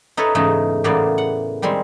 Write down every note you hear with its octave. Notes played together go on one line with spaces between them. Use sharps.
D#4 A4 B4 C#5 E5
E2 G#2 C#3 A3 D#4
A2 C#3 E3 A#3 B3 D5
F#5
D#3 G3 G#3 C4